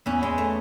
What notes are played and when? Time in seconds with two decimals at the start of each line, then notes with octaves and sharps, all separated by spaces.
0.06 E2 C#4 E4
0.22 E2 G#3
0.38 A3